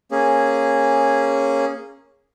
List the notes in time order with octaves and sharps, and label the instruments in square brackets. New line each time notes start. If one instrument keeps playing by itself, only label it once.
[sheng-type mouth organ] A#3 C#4 G#4